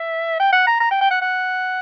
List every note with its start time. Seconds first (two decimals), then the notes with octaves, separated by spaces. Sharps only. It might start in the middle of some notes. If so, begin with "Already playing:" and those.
Already playing: E5
0.40 G5
0.53 F#5
0.67 A#5
0.80 A#5
0.91 G5
1.01 G5
1.11 F#5
1.21 F#5